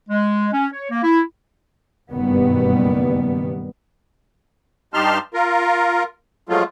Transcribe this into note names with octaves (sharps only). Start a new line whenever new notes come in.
G#3
C#4
C#5
A#3
E4
F#1 G2 B2 D#3 G3 B3
G2 D#4 G4 A5 C6 F6
F4 A#4
F3 F#3 G#3 A3 F4